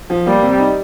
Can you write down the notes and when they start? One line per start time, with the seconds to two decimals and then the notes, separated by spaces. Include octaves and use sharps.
0.10 F3
0.26 G3 A#3
0.43 C3
0.60 D#4